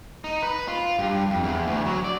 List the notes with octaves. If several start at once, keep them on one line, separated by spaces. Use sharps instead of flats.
D#4
B4
F4
G2
F2
E2
D2
F#3
D5